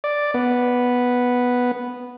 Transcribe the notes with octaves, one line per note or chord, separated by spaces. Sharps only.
D5
B3